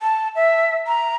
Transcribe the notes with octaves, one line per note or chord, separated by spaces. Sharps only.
A5
E5
A#5